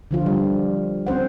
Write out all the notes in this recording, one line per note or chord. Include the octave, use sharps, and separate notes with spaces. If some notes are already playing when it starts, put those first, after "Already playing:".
D3 F3 F4
G3
C4 C#4 C5 F#5